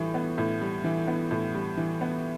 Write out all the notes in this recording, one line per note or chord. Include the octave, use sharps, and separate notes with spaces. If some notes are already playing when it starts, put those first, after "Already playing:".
Already playing: A2 E3 G3
B3
A2
G3
E3
B3
A2
G3
E3
B3